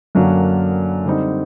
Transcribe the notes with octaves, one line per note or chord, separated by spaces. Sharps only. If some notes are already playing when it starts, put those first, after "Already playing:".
F#2 D3 F#3 A#3 D4
D3 G3 C4 D#4